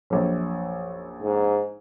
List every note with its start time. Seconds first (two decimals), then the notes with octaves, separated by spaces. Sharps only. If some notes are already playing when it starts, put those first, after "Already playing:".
0.10 A#1 F#2
1.23 G#2